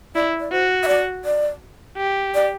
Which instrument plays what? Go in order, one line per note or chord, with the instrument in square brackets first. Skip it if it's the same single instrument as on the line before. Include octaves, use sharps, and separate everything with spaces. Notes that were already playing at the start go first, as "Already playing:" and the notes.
[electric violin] E4 [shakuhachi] D5
[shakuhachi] D5
[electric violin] F#4 [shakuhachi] C5
[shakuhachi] E5
D5
D5
[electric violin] G4
[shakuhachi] D5